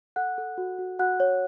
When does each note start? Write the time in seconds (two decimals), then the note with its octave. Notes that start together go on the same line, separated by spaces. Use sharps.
0.16 A4 F#5 F#6
0.38 A4
0.58 F#4
0.78 F#4
0.99 F#4 F#5 F#6
1.20 C#5